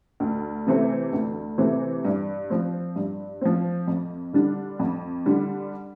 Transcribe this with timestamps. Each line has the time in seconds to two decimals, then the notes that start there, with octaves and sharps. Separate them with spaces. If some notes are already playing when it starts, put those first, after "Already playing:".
0.20 D2
0.66 C3 E3 A3 C4
1.13 D2
1.58 C3 E3 A3 C4
2.05 G2
2.50 F3 C4
2.96 G2
3.41 F3 C4
3.87 F2
4.33 D3 G3 D4
4.79 F2
5.26 D3 G3 D4